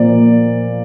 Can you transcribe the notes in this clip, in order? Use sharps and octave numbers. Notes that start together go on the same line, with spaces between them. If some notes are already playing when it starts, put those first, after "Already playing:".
Already playing: A#2 F3 A#3 D5